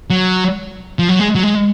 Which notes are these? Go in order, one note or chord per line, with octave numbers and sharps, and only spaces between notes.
F#3
F3
F#3
G#3
F#3
G#3